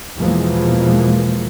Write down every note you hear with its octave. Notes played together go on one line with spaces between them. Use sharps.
E2 B2 E3 F3 G#3 A#3